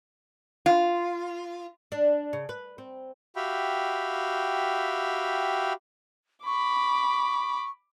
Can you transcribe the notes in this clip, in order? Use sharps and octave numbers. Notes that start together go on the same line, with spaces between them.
F4
D4
C#3
B4
C4
F#4 G4 E5 F5 G5 B5
B5 C#6 D6